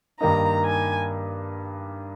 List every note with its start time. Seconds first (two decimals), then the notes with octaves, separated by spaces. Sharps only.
0.20 G2 D#3 A#3 D#4 A#5
0.65 G#5